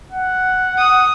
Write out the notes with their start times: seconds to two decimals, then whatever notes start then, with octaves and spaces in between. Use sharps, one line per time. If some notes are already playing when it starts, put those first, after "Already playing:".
0.11 F#5
0.78 D#6